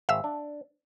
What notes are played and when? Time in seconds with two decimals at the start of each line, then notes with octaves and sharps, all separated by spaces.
0.09 G#1 E5 F5 E6
0.24 D4